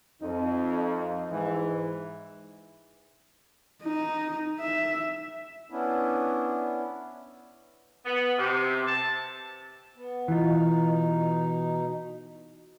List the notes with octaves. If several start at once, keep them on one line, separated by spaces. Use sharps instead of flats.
F2 D#4
G#2 E3
D#4
E5
B3 C#4 D4 E4
B3
C3
A5
B3
B2 E3 D#4 F4